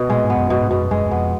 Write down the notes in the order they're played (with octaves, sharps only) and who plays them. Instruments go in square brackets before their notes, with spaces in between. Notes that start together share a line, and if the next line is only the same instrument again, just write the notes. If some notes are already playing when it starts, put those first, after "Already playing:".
Already playing: [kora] B2
[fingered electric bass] A#2 [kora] G#3
[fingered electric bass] G#2
[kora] B3
[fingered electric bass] F#2
[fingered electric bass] F#2 [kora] B2
[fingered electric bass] G#2
[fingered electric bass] F#2 [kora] B2
[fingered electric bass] F#2
[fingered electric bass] F#2 [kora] G#3
[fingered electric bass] F#2
[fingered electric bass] F2 [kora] B3